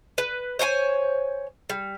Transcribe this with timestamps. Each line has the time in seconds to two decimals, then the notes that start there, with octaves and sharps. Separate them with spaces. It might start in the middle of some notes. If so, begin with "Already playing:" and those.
0.18 B4
0.59 C5 C#5 G5 G#5
1.70 G3